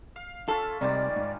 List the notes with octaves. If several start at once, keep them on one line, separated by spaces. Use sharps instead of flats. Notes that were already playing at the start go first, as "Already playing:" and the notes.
F5
C#4 F4 A4 E5
C2 C3 D#3 G3 G#3 D5
G#2